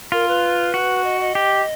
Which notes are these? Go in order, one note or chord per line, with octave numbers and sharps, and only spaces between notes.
F4 A#4
B4
F#4
D#5
D#5
G4